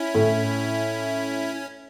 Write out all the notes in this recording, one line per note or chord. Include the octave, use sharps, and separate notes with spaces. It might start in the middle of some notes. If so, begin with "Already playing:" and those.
Already playing: C#4 E4
A2